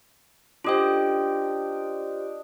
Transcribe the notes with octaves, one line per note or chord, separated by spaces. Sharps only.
D4 F4 G4 C5 D#5 G5